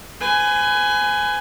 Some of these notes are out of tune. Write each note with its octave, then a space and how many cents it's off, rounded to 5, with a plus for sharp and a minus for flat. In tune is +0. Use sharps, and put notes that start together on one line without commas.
B4 +35 G#5 +0